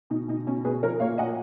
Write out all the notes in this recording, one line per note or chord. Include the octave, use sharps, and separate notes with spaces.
B2 D#4
B2 D#4
B2 C#4
B2 G#4 B4
F3 A#4 C#5
A#2 C#5 F5
A#2 D#5 F#5